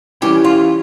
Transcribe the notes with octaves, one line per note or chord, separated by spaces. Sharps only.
E3 G3 C#4 E4 G4
F4